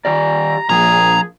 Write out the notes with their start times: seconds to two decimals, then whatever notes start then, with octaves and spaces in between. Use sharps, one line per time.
0.05 D#3 G4 D5 A#5
0.69 A#2 F3 G#4 A#5